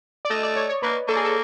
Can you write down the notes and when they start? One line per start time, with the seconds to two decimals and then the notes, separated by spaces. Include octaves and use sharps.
0.25 D5
0.30 A3 D#5
0.43 D5
0.56 C#5
0.69 C#5
0.82 A#3 B4
1.08 A#3 A4
1.16 G#4
1.24 A4